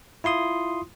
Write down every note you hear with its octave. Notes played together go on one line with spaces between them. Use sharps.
E4 F4 C6 D#6